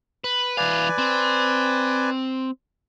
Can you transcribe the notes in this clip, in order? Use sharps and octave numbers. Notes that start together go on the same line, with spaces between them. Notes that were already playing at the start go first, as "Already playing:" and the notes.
B4
E3 B4 D5 F5 G#5
C4